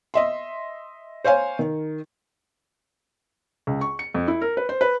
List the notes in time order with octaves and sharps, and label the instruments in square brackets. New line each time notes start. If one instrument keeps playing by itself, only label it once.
[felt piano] D#5 E5 C6
C5 C#5 F5 G#5
D#3
C#2
C#6
C#7
F2
E4
A#4
B4
C5
B4